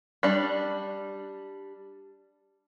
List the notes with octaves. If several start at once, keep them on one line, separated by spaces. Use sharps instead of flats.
G3 D4